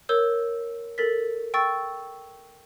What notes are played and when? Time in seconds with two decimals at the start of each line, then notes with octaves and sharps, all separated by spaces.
0.09 A#4 C#5 E6 G6
0.98 A4 A#4 A6 B6
1.54 G5 C#6 E6 A6